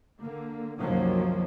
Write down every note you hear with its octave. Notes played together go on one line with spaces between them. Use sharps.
D3 A#3
C2 F#2 D#3 F3 F#3 A#3